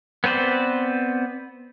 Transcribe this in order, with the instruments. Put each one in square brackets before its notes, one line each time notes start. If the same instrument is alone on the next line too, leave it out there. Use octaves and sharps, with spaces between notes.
[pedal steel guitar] B3 C4 B4 C5 D5